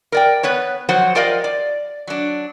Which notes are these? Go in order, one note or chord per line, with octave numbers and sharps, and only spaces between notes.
A#4 D5 G5
B3 B4 C#5
F3 F#3 C5 F#5
F4 G4 A#4 D5 D#5 F5
D5
F#3 D4